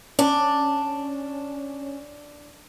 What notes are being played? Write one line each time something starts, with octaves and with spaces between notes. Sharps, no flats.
C#4 D4